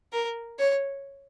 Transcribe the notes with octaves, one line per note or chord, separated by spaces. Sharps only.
A#4
C#5